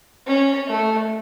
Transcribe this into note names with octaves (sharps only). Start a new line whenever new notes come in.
C#4
A3